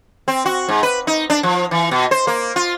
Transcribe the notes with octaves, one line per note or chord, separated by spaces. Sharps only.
C4
F#4
G#2
B4
D#4
D4
F3
E3
B2
C5
A#3
F4